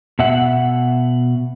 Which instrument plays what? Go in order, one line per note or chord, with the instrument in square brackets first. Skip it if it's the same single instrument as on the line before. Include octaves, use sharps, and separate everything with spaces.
[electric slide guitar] B2 E5 F#5